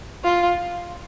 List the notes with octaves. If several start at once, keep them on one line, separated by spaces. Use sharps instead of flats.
F4